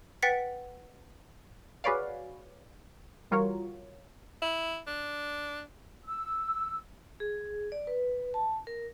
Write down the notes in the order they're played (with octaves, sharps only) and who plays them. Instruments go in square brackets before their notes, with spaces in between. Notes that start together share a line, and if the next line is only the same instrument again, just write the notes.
[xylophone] B4 F#5 G5 A6 B6 C#7
[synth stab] F#4 G#4 B4 C#5 D5 F5
E3 G3 F4 F#4 A#4 C#5
[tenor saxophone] E4
D4
[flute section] E6
[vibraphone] G#4
D5
B4
A5
A#4